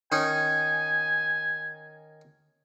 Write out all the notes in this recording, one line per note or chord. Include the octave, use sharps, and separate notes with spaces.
D#3 C#4 D#4 G#5